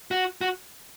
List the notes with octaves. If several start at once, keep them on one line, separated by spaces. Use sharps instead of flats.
F#4
F#4